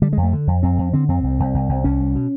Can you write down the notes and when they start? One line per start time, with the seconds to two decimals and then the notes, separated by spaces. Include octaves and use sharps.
0.02 D3 G3
0.13 F2 G#3
0.23 A3
0.33 D3
0.47 F2
0.63 F2 C4
0.78 F2
0.93 D3 C4
1.08 F2 C4
1.23 C2
1.40 C2
1.54 C2
1.69 C2
1.84 C2 C#4
2.00 C2
2.15 B2